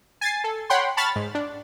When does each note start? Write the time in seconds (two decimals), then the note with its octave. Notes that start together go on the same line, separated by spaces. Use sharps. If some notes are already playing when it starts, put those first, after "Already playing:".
0.21 G#5 A6 C7
0.44 A4
0.70 C#5 F#5 G5 B5 C6
0.97 A5 B5 C#6 F6 A6
1.16 G#2
1.35 D4